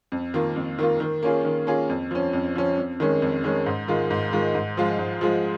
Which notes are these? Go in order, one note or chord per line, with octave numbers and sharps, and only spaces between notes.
F2
D#3 A#3 F4
F2
D#3 A#3 F4
D#3
A#3 C#4 F4 G#4
D#3
A#3 C#4 F4 G#4
F2
F3 C#4
F2
F3 C#4
F2
D#3 G#3 C#4
F2
D#3 G#3 C#4
G#2
D#3 G#3 F4
G#2
D#3 G#3 F4
G#2
F3 G#3 F4
G#2
F3 G#3 F4